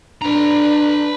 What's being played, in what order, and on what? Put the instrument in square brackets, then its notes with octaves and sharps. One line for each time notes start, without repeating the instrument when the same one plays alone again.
[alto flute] D4 [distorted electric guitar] B4 A#5